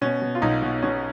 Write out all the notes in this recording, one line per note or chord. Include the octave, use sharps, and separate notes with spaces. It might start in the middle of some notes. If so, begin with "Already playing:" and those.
B2 C#4
B2
F4
B1 D#4
B2
B2 C#4